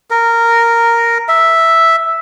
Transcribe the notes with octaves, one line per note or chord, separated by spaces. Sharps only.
A#4
E5